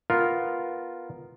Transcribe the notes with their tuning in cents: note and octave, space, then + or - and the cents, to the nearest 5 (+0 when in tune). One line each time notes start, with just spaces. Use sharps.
B3 +0 F4 +0 A#4 +0